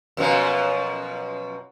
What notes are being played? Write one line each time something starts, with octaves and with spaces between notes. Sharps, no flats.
F#2 B2 F3